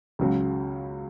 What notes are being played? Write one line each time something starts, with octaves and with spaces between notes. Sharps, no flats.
C#2 C#3 F#3